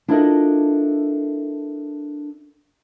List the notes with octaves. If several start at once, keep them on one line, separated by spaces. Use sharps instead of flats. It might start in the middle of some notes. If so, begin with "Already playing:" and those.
D4 E4 F4 A4 A#4 D#5